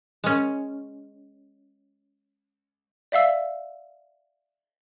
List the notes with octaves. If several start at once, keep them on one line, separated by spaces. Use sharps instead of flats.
G#3 C#4
D5 E5 F5 E6